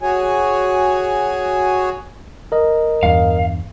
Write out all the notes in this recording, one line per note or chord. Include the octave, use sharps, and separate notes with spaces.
F#4 G#4 C#5 G#5
A#4 D#5
E2 G2 F5